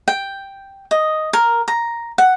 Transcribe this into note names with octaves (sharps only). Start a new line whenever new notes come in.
G5
D#5
A#4
A#5
F#5